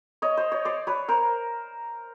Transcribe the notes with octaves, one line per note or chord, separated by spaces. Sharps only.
C#5 D#5
C5
C#5
C5 D5
B4 C#5
A#4 C5